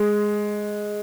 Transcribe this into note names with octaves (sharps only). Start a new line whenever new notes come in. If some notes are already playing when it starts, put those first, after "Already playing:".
Already playing: G#3